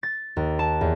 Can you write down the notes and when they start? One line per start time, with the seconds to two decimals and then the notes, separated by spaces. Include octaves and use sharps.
0.03 A6
0.37 D#2
0.59 A5
0.81 E2